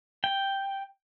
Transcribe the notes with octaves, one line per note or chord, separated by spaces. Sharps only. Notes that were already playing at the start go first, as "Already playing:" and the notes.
G5